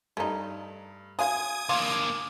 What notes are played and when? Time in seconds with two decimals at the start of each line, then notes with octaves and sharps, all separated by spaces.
0.17 G2 A3 D#4
1.19 F#3 F5 G#5 D#6 G#6
1.69 D3 A#3 F4